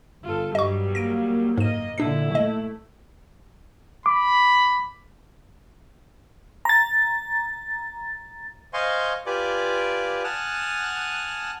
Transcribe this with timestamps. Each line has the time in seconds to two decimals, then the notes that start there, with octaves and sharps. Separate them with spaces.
0.24 G1 F4 A4
0.55 G2 F#3 G3 D#5 C#6
0.95 A#3 A#6 D7
1.58 F#1 G#2 A#3 D#5 D#7
1.98 A#2 D3 D4 E4 C7
2.35 A3 D#5
4.06 B5 D6
6.65 A#5 A6
8.73 C5 D#5 F5 G#5 C6 C#6
9.26 F4 G4 B4 D5 G#5 D6
10.24 F#5 G#5 A5 D#6 F6 F#6